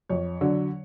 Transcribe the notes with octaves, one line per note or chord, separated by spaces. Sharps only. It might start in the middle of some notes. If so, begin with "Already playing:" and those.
F2 C#5
D3 F#3